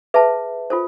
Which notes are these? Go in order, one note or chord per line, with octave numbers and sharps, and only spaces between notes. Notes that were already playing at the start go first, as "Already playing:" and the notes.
G#4 B4 E5 A5
F4 A4 C5